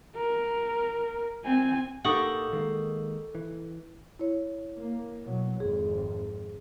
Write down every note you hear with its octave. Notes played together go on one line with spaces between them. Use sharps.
A#4
C4 G#5
A2 A#3 D#4 G4 A4 F#5 C#6
D#3 G#3 A#3
E3
E4 C#5
A#3
B2 F#3
G#1 F2 G#4